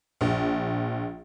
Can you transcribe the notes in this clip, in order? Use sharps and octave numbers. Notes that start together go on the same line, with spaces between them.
A#1